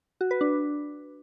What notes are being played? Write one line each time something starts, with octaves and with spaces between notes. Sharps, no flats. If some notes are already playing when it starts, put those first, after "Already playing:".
F#4
B4
D4